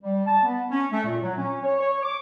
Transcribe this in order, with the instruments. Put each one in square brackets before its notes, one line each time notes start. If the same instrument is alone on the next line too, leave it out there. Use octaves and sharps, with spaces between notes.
[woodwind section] G3
A5
B3
C#4
A3
A#2
F#3
C#4
C#5
C#5
D6